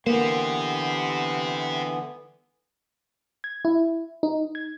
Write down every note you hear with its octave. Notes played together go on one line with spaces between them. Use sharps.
D3 E3 A#3 B3 G4 C5
G#6
E4
D#4
G#6